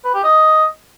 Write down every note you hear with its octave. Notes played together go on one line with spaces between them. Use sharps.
B4
G4
D#5